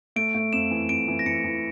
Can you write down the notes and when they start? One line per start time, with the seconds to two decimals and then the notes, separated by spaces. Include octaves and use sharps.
0.16 A3 D7
0.35 A3
0.53 F2 E7
0.71 E3
0.89 F2 D7
1.08 E3
1.19 A#6
1.26 E3 C#7
1.44 E3